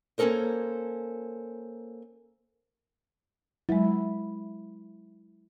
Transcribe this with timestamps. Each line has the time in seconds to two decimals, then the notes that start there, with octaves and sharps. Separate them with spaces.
0.18 A#3 C#4 D#4 A4 A#4 C5
3.69 F#3 G#3 E4